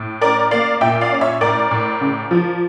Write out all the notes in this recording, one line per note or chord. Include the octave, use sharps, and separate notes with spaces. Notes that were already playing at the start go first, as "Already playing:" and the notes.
Already playing: A2
C#4 A#4 D5
A#3 D5 F5
A#2 E5 G5
D5 F5
C#4
C#5 E5
A2 A#4 D5
A2
C#3
F3